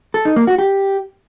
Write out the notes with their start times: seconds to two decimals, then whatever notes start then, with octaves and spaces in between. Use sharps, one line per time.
0.14 A4
0.25 D#4
0.36 A#3
0.47 F#4
0.58 G4